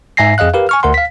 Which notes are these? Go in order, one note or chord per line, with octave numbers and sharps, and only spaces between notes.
G#2 E5 G#5 A#6 C7
F2 G#4 D#5 F5 F#6
G4 A#4 B4 F5
G#5 C#6 F6
D2 A#4 F#5 C6
F5 B6